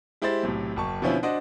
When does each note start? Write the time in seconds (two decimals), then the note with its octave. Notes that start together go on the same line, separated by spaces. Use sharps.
0.22 G#3 E4 G4 C5 C6 A6
0.43 B1 A2 C3
0.76 F#1 A5 C#6
1.02 B2 D3 F3 C4 C#4 E4
1.23 D4 F#4 C5 D#5